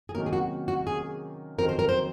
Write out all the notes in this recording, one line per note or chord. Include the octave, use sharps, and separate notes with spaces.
G#4
C3 D#3 F#3 A#3 C#4 A#4
G#4
F#4
F#4
G#4
F2 D#3 F#3 C4 A#4
C5
A#4
C5